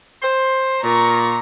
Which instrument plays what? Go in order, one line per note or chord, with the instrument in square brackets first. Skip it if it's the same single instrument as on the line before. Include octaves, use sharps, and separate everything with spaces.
[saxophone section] C5
[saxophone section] A#2 [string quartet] A#5 C#6